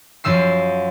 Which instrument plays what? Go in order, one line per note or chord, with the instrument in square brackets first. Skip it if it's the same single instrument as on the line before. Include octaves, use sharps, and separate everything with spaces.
[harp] F#2 F3 E6 C7